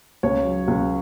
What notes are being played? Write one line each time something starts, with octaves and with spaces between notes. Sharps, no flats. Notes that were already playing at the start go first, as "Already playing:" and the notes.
C#2 C#5
F#3
C#2